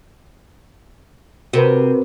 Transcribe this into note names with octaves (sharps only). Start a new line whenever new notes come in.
C3 F#4 A#4 B4